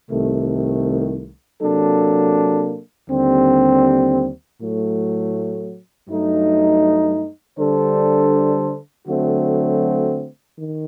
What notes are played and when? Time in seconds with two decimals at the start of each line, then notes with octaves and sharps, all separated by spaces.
0.10 C2 C3 D#3 A3
1.60 C3 F#3 A#3 D4 A4
3.09 D#2 D3 G3 C4
4.59 A2 F#3 A3
6.08 G2 F#3 A3 D#4
7.57 D3 G3 D4 A4 C5
9.07 D3 F#3 A3 C4 F#4
10.56 D#3